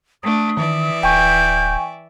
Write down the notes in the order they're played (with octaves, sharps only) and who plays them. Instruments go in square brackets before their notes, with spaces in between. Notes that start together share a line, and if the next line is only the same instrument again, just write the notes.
[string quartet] A3 D4 [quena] D#6
[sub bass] D#3 [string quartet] E3 D5 E5
[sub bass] D1 [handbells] G5 G#5 C#6 [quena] G6